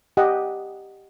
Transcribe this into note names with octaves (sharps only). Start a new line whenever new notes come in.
G4 D#5 F#5